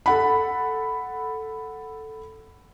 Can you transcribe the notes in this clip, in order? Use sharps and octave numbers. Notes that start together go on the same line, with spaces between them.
A4 F#5 B5